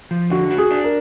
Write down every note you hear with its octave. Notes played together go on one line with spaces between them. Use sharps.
F3
D3 F#4
F#4
G#4
D4
A#4